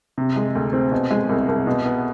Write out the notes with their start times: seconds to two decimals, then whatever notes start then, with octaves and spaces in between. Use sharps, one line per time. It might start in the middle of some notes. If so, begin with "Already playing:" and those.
0.18 C3
0.36 G#3
0.55 D2
0.73 C4
0.92 B2
1.11 G#3
1.29 C2
1.48 C2
1.67 B2
1.85 B3